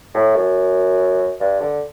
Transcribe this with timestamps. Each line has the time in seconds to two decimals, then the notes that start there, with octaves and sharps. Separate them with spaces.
0.14 A2
0.35 F#2
1.40 G2
1.60 D3